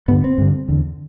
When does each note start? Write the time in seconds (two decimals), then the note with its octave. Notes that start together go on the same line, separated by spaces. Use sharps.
0.08 G2 B3
0.11 D3
0.24 C4
0.38 G2 D3
0.68 E2 D3